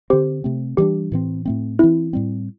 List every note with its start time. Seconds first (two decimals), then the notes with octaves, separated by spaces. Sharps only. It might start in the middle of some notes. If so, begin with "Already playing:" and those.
0.10 D3 C4 G4 C5
0.44 C3 A3 C4
0.77 E3 G3 D4 G4
1.12 A2 E3 C4
1.45 A2 A3 C4
1.79 E3 C4 E4
2.13 A2 G3 C4